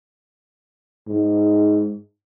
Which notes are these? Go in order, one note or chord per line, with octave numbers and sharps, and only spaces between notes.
G#2